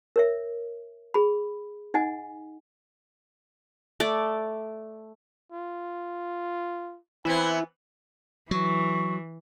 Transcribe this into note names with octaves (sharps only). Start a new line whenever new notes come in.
A#4 C#5 E5
G#4 B5
D#4 D#5 F#5 G#5
A3 D5
F4
E3 B3 C4 E4 G#5
E3 F#3 C#6